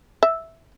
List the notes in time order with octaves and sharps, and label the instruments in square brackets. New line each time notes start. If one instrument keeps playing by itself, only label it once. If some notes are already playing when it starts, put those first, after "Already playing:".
[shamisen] E5